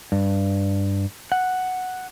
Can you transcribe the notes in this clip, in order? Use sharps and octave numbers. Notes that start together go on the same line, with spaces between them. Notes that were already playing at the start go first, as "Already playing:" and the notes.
G2
F#5